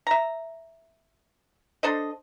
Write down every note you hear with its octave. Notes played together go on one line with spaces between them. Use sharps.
E5 A#5
D4 A4 C5 D#5